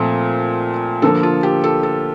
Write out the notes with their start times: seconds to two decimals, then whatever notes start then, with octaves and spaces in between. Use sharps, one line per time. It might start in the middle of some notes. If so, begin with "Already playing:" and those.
Already playing: A#2 F3 A3 C4
1.02 D3 F3 A#3 A4
1.23 F4
1.43 G4
1.64 A4
1.83 A4